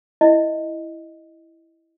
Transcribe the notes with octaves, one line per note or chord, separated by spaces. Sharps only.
E4 D#5 E5